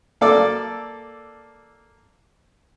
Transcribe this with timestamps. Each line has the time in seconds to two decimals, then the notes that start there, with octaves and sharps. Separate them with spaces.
0.21 A#3 A4 D5 D6 E6